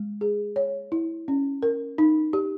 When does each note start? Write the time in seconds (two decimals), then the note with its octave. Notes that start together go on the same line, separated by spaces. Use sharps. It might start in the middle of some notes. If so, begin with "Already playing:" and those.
Already playing: G#3
0.21 G#4
0.56 C#5
0.92 E4
1.28 C#4
1.62 A#4
1.98 D#4
2.33 G4